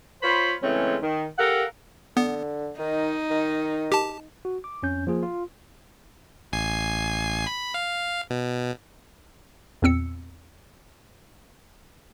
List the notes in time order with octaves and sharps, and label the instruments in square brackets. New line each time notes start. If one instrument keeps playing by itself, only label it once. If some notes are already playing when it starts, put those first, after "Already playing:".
[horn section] F4 C5 C#5 B5
C#3 E3 G#3 A3 C4 C#4
D#3
G4 A4 A#4 F5 F#5
[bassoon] D3 [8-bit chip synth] B3
[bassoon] D#3 [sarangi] D#4
[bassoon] D#3
[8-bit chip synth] G4 A5
[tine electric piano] F#4
D6
F2 C#4 G6
F3 A#3 F4 G#4
F4
[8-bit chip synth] A1 G#5 C7
B5
F5
B2
[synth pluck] E2 A#2 C4 E6 C#7